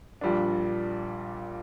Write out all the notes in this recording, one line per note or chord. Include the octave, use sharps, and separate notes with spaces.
A#1 A#2 G3 D4